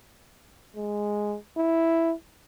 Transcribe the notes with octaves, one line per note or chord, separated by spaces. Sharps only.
G#3
E4